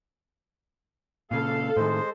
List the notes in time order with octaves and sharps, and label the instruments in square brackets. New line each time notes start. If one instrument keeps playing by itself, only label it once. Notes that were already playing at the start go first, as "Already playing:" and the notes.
[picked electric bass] A#2 C#3 [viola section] A4 [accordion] F5
[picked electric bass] A2 D#3 [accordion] G#3 C5